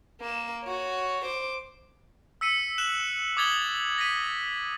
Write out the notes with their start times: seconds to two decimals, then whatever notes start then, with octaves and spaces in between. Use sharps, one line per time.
0.21 A#3 E7
0.65 F#4 C#5
1.25 C5 D6
2.41 E6 B6 C#7 D#7
2.78 F#6 E7 F#7
3.37 D6 D#6 G#6 A6 F#7 G7
3.98 A#6 B6 D#7